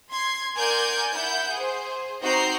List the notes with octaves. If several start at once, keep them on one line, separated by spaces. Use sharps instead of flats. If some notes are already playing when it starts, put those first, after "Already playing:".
C6 G#6
A#4 D5 F#5 G#5 G6 G#6
E4 F#5 G6
G#4 C5
C4 D#4 F#4 A#5 G6 C7